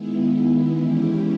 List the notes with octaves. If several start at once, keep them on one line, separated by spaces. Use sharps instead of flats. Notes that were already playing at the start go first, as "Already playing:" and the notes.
Already playing: D#3 G#3 B3 E4
E3 G#3 C#4 E4 G4